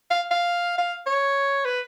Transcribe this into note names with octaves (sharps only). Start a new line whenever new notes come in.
F5
F5
F5
C#5
B4